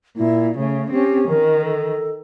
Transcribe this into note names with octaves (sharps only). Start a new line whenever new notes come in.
A#2 E4
C#3 A3
C4 C#4 G4
D#3 A#4
A4